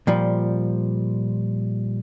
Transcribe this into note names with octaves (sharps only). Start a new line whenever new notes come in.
A#2 F3 G3